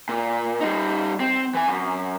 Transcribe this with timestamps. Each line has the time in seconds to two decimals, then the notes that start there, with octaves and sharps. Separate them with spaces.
0.09 A#2
0.61 G3 D#4
1.20 C4
1.55 E3 G#5
1.68 F#2